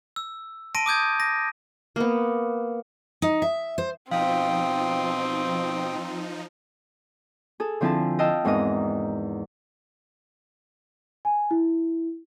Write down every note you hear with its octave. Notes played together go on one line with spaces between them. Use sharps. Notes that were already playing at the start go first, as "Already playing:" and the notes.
E6
A5 C6 A#6 D7 D#7
D6 D#6 G6 G#6
A#6
A#3 B3
D#4
E5
C5
B2 F3 C4 D#4 F5 G5 D#6
G#4 A4
D3 F3 C4 E4 G#5 A5
D#5 F5 G5 A5 E6
E2 G#2 C4 A#4 D#5 D#6
G#5
E4